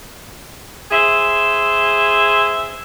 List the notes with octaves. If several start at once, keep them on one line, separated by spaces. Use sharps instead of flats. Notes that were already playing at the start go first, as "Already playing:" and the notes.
G#4 C5 E5